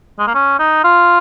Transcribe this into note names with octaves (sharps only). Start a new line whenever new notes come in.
G#3
A#3
C#4
D#4
F4